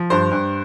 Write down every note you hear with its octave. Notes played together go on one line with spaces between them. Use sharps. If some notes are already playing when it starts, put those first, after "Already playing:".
Already playing: F3
G2 C5
G2